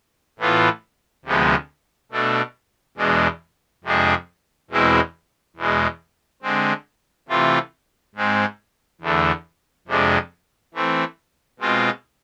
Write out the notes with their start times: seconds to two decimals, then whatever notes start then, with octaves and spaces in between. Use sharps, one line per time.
0.39 A2 E3 B3 F4
1.25 D2 C3 F3 G#3 B3
2.12 B2 A3 D4
2.97 E2 B2 G#3 D4
3.84 F2 C3 G#3 D4 G#4
4.70 E2 B2 G#3 C4 E4
5.56 E2 B2 G#3
6.42 D3 G#3 C4
7.28 C3 E3 A3 C4 F4
8.15 G#2 G#3 C4
9.01 E2 D3 A3
9.88 F2 C3 G#3 D4
10.74 E3 A3 C4
11.59 B2 G#3 C4 F4